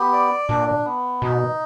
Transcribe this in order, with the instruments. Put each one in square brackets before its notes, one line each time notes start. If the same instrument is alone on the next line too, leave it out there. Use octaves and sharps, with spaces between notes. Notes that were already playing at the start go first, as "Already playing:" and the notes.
Already playing: [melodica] B3 G4
D5
[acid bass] A#2 [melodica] D4
[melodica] B3
[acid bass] B2 [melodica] D#4